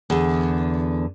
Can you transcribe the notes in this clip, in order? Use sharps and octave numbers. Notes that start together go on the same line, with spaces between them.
E2 D3